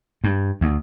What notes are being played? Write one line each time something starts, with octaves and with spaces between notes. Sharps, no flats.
G2
D2